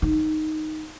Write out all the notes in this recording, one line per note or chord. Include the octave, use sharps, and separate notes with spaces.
D#4